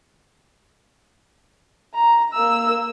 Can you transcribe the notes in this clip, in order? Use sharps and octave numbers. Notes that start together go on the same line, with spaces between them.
A#5
A#3 E6